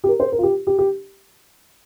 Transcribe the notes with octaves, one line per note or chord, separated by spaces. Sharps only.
G4
A#4
C5
A#4
F4
G4
G4
G4